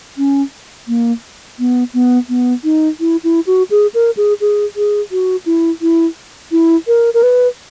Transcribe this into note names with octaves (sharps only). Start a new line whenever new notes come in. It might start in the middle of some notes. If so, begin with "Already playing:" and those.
C#4
A#3
B3
B3
B3
D#4
E4
E4
F#4
G#4
A#4
G#4
G#4
G#4
F#4
E4
E4
E4
A#4
A#4
B4